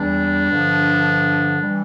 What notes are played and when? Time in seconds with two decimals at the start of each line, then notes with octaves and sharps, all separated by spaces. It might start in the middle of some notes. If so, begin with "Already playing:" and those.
Already playing: E2 E3 G3 D4
0.48 G2 D3 F3
1.61 E3 G3